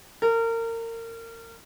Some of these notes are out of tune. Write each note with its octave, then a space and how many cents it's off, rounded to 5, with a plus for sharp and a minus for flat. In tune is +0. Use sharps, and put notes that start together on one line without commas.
A#4 -30